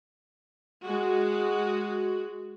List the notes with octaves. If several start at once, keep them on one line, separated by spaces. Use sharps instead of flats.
G#3 F#4